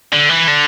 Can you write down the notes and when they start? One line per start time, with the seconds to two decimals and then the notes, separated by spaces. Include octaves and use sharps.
0.13 D3
0.29 E3
0.48 D3